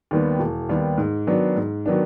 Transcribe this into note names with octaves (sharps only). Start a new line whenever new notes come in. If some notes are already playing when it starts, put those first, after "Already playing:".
D#2 D#3 G3 B3
E1
D#2 D#3 G3 B3
G#2
D#3 F#3 B3 D4
G#2
D#3 F#3 B3 D4